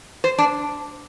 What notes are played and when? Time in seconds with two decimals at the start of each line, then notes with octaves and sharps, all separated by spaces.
0.24 C5
0.39 D4